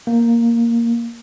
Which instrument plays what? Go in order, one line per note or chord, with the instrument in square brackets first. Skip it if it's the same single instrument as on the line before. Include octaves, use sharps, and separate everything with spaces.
[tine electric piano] A#3